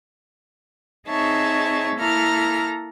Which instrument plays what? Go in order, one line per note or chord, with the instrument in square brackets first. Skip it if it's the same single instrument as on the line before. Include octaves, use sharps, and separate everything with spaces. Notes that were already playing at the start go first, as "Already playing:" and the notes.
[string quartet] C4 D#4 G#4 C#5 E5 A5
A#3 E4 A4 A#5 F6